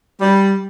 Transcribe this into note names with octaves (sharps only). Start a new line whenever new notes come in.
G3